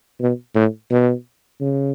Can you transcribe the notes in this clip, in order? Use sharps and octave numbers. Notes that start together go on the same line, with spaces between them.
B2
A2
B2
C#3